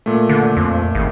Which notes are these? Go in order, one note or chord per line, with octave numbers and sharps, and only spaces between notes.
A#2 A3
D3
F2
G#1